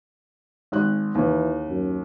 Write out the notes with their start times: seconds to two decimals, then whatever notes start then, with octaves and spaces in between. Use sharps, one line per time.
0.72 G#1 F#6
1.15 D#2 E3
1.68 F#2